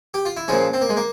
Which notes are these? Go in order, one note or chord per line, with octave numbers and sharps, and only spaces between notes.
G4
F4
E4
A#2 F3 G#3 C#4
C4
A#3
G#3
A#3